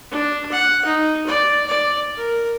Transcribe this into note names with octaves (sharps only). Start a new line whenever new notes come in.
D4
F#5
D#4
D5
D5
A#4